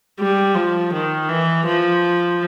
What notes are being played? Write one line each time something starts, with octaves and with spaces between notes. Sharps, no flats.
G3
F3
D#3
E3
F3